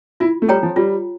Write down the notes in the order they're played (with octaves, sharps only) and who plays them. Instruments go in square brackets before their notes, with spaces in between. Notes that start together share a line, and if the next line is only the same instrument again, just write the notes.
[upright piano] E4 [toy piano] F4
[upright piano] A3
[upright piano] G3 [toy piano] A4 C#5 G5 A#5
[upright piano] F3
[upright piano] G3 [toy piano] F4